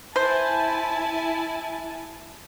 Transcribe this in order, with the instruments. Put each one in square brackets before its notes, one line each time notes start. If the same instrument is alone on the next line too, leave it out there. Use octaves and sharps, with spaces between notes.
[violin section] E4 G#5 A5 [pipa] C5